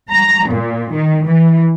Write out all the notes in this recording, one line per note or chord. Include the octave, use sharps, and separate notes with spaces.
A#5
A#2
D#3
E3